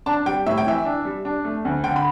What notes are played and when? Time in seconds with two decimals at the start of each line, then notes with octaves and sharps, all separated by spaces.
0.06 D4 A5
0.26 G3 G5
0.46 A2 E5
0.58 G5
0.66 E3 E5
0.85 D4
1.05 G3
1.25 D4
1.45 A3
1.65 D2
1.84 D3 G5
1.96 B5